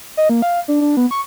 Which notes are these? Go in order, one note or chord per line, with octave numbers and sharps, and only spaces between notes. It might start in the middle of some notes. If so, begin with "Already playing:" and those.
D#5
A#3
F5
D4
D4
B3
C#6